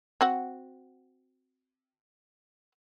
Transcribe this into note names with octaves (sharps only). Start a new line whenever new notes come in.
C4 F#4 F#5